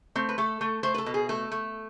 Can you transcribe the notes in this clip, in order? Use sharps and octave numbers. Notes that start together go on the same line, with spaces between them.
A3 C4
B4
A3 A4
A3
A3 C5
B4
A4
B2
G#4
A3 A4
A3